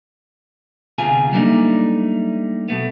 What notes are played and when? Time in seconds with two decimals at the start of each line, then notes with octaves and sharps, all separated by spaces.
0.98 D2 C3 B3 F4 G#4 G#5
1.32 F#3 G3 A3 A#3 D4 D#4
2.68 B2 A3 B3